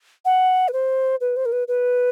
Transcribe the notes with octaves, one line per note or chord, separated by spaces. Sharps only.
F#5
B4
C5
B4
C5
A#4
B4
B4